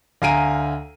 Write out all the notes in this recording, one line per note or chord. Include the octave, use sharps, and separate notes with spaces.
D2 F5 G#5 A#5 D7 D#7